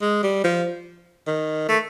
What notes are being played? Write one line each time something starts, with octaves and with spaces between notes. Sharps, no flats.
G#3
G3
F3
D#3
A3